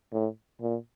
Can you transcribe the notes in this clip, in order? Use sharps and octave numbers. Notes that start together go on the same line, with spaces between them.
A2
A#2